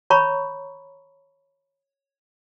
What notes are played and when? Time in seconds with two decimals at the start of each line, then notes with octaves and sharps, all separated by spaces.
0.10 C#5 A#5 B5 C#6